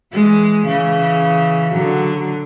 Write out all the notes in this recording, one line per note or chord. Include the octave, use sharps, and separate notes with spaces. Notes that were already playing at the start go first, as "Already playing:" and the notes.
E3 G#3
C#3 E3
D3 F#3